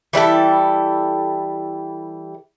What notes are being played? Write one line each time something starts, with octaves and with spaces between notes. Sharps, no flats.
E3 G3 E4 A4